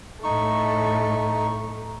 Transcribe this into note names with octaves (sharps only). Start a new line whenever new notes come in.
A2 A3 D#4 C#6